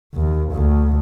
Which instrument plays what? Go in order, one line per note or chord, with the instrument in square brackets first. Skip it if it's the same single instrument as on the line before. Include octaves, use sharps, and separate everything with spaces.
[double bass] D#2
D2